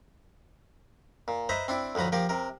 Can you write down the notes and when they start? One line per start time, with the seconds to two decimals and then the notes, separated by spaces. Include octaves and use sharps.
1.28 A#2
1.49 B4 C5 D#5 E5 A#5
1.68 C4 D4 E4
1.95 D2 A2 F3 B4 A#5
2.12 F3 A#3 G4 A#4
2.29 C3 A#4